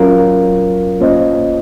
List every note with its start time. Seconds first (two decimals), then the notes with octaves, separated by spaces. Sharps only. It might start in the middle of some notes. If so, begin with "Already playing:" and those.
Already playing: F#3 C#4 F4 A#4 F5
1.00 A#3 C#4 F4 C5 D#5